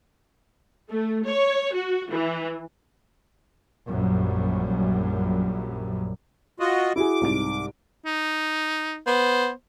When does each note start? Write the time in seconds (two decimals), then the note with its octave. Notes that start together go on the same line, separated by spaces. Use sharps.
0.89 A3
1.25 C#5
1.72 F#4
2.10 E3
3.88 A#1 F#2 G3
6.60 F4 F#4 D#5
6.96 E4 F#4 G#4 D6
7.21 C2 G#2 D7
8.06 D#4
9.07 B3 C5